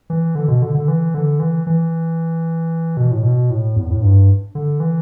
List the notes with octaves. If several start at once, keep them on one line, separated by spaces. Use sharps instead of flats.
E3
D3
B2
D3
D3
E3
D3
E3
E3
B2
A2
B2
A2
E2
A2
G2
D3
E3